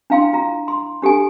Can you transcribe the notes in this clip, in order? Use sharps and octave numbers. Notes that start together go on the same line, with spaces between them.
D4 E4 F5 G5 C6
F4 A#5
C6
D4 G4 A4 G#5